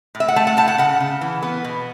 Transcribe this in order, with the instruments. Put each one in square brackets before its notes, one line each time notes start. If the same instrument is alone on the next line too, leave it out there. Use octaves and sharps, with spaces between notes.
[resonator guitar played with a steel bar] A2
E5
F#5
A3 A5
F#5
A2 A5
F#5
C#3 F#5
C#3
E3
B3
B2